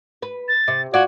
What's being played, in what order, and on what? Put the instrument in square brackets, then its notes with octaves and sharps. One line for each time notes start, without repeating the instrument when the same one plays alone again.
[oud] B4
[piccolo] A6
[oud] C3
[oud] F4 D5 [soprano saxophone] F#4 [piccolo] G#6